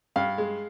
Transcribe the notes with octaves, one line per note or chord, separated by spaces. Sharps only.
G2 F5
G#3